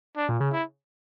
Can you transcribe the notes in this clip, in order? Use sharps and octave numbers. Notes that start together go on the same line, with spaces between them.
D4
A#2
C#3
E4